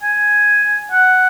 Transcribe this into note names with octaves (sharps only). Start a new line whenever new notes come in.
G#5
F#5